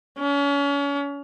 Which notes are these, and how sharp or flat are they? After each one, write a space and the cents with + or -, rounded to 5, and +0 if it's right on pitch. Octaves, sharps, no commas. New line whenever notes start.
C#4 +35